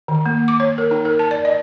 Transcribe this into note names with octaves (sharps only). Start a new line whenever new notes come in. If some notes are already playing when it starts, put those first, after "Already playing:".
D#3
A#3
D6
C#5
A#4
D#4
A#4
A5
D5
D#5